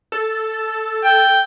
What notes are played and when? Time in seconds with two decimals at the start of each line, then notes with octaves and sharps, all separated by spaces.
0.12 A4
1.04 G5